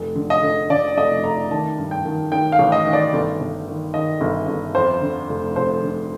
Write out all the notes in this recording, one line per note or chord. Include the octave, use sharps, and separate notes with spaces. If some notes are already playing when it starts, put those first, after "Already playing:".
Already playing: F1
D3
D#5
D3
D3 D5
F1 D#5
A3 A#5
D#3 A5
G2
G5
D#3
D#3 G5
F5
A1
D#5
D#3
D5
G1
G1
D#3
D#3 D#5
G1
G1
F2 C5
D3
F1
F1 C5
D3